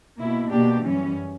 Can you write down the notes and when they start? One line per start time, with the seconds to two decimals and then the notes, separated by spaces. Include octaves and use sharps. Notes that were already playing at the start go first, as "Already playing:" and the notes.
0.17 B2 A#3 E4
0.50 B2 A#3 D4 G4
0.82 F#2 E3 G3 C#4